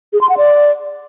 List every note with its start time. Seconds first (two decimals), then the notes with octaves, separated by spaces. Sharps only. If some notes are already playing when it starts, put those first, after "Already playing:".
0.13 G#4
0.21 C6
0.29 F#5
0.37 D5